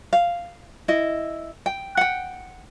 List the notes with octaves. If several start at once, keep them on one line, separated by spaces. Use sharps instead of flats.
F5
E4 D#5
G5
F#5 G5